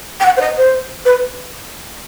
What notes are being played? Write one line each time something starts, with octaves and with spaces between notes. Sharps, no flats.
G5
F#5
C5
D#5
C5
B4